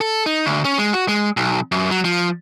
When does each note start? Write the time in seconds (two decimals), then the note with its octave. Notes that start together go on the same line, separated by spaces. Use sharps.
0.01 A4
0.26 D#4
0.46 D2
0.65 C#4
0.78 G#3
0.93 F#4
1.09 G#3
1.37 B1
1.72 F#2
1.91 F#3
2.05 F3